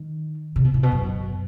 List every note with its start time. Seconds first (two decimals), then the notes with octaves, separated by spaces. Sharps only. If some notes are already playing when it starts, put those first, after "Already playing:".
Already playing: D#3
0.56 C3
0.64 B2
0.74 A2
0.83 B2
0.92 F#2